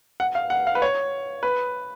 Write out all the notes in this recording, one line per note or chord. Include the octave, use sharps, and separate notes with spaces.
F#5
F5
F#5
F5
B4
C#5
B4